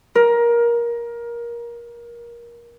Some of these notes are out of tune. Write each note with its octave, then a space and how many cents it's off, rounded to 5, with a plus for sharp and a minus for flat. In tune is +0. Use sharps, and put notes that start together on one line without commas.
A#4 +20